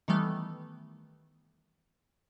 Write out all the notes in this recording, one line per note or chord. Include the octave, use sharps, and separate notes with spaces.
D#3 E3 G3 A3 B3